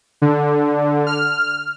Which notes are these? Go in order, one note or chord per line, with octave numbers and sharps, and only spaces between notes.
D3
F6